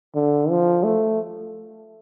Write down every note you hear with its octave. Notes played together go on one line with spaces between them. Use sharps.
D3
F3
A3